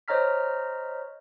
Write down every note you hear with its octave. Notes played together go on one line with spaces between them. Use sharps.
C5 C#5 D#5 A#5 F6 B6